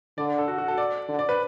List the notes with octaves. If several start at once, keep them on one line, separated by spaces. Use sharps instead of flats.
D3 D5
A4
F#4
F#4
A4
D5
D3
D5
B4